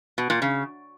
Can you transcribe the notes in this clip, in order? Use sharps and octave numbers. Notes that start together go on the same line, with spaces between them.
B2
A#2
C#3